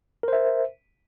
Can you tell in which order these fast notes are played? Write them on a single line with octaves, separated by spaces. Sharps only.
A#4 C5 E5